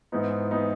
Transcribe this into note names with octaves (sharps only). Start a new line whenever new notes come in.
G#2 E3 B3 D#4
E3 B3 D#4